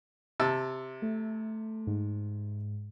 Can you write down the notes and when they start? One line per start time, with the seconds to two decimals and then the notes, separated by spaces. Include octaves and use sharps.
0.40 C3 A5 E6
1.02 A3
1.87 G#2